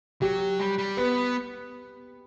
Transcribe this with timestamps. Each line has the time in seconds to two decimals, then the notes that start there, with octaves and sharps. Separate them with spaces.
0.22 F#3 G4
0.59 G3
0.78 G3
0.97 B3 B4